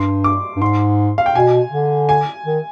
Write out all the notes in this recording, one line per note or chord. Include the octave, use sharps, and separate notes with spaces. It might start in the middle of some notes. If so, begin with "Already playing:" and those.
Already playing: G2 C6
D6
G2
G#2 C6
F5
G5
B2 G#5
D3
G#5
D#3